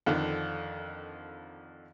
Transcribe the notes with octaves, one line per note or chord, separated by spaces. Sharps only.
F2 D3 D#3 D4